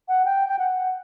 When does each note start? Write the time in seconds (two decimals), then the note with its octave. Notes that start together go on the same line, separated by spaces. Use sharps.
0.08 F#5
0.25 G5
0.49 G5
0.59 F#5